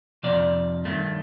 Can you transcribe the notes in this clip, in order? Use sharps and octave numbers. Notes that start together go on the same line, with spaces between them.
F2 C3 F3 D5
G2 D#3 A3